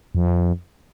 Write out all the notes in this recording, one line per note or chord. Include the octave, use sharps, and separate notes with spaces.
F2